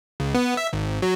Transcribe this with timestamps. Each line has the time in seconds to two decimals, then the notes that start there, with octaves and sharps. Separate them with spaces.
0.20 C#2
0.34 B3
0.57 E5
0.73 G#1
1.02 F#3